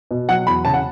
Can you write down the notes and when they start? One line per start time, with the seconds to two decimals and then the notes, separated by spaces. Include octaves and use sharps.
0.11 B2
0.29 F#3 F#5
0.47 E2 B5
0.65 C#3 A5
0.74 F#5